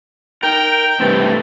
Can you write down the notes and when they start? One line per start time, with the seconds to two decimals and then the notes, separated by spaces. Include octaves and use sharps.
0.43 D#4 A#4 G5
1.00 G2 C3 E3 A3 C4